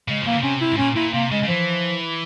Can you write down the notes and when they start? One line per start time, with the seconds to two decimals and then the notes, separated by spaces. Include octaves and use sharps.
0.08 C#3 G#3
0.22 F3
0.26 E3 A#3
0.36 C#3
0.43 C3 C#4
0.61 E4
0.73 G#2
0.78 A#2 C#4
0.96 A#2 E4
1.14 C3 A#3
1.31 C#3 G#3
1.43 C#3
1.48 E3 F3